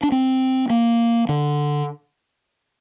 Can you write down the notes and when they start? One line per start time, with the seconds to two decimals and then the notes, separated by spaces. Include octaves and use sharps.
0.03 D4
0.12 C4
0.70 A#3
1.29 D3